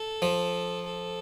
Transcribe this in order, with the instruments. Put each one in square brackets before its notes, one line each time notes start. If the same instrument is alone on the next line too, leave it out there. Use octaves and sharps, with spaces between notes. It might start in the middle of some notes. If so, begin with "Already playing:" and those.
Already playing: [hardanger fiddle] A4
[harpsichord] F3
[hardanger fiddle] A4